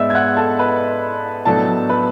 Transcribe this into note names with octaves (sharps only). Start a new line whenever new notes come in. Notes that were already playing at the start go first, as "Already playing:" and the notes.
Already playing: G#2 G#3 B3 D5 E5 E6
G#6
F#5 F#6
A4 A5
B4
A2 F#3 B3 D4 A4 A5
B4 B5